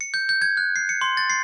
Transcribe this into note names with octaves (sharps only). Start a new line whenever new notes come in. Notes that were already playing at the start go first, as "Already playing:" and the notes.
C#7
G6
G6
G#6
F#6
C7
C#7
C6
A6
C7